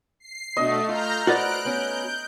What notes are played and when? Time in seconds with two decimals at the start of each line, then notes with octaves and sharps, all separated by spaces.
0.20 C7
0.57 B2 A3 D4 F#4 D#5
0.89 F4 A#5 F6 G6
1.27 F#4 B4 C5 D5 F#6 D7
1.65 B3 C#4 G6